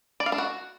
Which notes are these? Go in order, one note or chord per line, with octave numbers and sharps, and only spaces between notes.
D5
F5
D4
F#4